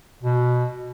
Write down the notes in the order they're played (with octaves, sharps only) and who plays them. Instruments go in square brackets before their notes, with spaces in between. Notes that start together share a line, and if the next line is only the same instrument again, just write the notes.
[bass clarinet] B2